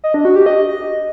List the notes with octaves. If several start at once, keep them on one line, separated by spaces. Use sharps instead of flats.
D#5
D4
F#4
G4
D#5